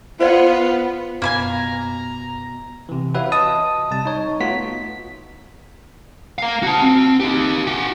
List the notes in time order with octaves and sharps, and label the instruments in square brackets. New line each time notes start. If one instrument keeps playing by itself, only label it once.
[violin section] B3 [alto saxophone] F4 [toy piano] C5 D5
[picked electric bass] F#1 [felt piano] B2 [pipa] A#3 B4 G#5 [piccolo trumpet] A#5
[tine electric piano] C3 E3
F#4 G4 B4 C#5 E5 F5
D#5 A5 D#6
C3 G3 A5
D#4 C#5
A3 B3 F4 F#4 B6
[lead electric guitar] A#4 F5
F#4 A5
C4
D#4 G4
F#4 G5